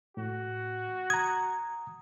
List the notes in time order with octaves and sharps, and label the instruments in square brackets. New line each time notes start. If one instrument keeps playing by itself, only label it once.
[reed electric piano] A2 [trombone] F#4
[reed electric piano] A#5 D#6 [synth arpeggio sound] G#6